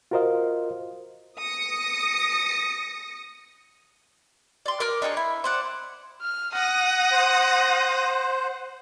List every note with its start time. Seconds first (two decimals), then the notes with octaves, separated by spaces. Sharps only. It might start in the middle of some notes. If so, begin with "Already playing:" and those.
0.11 F4 F#4 A#4 C5 D#5 F5
1.38 D#6 A#6 C#7
4.66 D5 C6
4.80 A#4 D6 F6
5.02 D4 D#4 G#4 C#5
5.17 E4
5.44 C5 D5 F#5
6.22 F6
6.55 F#5 D#6 A#6
7.11 C5